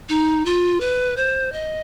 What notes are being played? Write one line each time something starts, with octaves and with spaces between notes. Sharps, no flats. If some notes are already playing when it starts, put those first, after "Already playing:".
D#4
F4
B4
C5
D#5